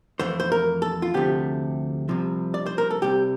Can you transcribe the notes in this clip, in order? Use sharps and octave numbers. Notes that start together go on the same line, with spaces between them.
F2 E3 A3 C5
C5
A#4
A4
F4
D2 C3 F3 A3 G4
C2 C3 F3
D5
C5
A#4
A4
C2 C3 G3 G4